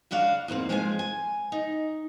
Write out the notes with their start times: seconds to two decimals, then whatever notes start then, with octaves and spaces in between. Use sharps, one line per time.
0.11 F#2 C#3 D4 F#4 F5
0.48 E2 G#2 A#3 C4
0.69 F3 G#3 C5 E5 G#5
0.99 G#5
1.52 D#4